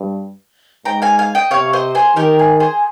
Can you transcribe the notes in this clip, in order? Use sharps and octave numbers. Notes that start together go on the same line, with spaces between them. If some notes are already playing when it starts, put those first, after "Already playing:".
Already playing: G2
G#2 G5 A#5
F5 G#5
F5 G#5
D#5 G5
C3 C#5 F5
C5 D#5
G#4 C5
D#3 G4 A#4
G#4
G#4 C5